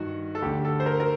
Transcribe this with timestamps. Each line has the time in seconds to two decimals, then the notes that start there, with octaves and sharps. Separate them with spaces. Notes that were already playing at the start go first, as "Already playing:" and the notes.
Already playing: G2 D#3 F#4
0.35 A4
0.42 D2 D3 G4
0.65 A4
0.80 C5
0.86 A#4
1.00 A#4